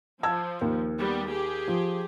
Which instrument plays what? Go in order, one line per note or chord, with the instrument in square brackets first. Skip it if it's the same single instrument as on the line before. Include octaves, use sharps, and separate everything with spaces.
[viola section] F3 [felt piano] A5 E6 G#6
[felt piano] D#2
[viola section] G3 B3
G4 G#4
[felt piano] F3